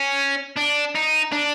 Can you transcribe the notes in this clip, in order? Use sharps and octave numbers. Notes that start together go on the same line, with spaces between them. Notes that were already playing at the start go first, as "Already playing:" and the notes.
Already playing: C#4
D4
D#4
D4